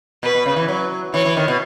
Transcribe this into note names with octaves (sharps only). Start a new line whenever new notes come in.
B2 B4
B2
C#3
E3
F#3
E3 C#5
E3
D#3
B2